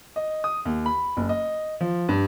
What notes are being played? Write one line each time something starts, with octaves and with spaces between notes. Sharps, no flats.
D#5
D#6
D#2
B5
F#1
D#5
F3
G2